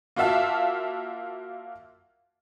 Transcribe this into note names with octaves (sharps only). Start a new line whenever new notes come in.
A#3 F4 F#4 E5 F5 A5